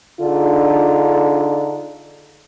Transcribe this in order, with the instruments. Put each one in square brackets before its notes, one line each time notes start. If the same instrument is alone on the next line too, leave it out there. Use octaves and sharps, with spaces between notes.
[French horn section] D3 D4 D#4 F4 G#4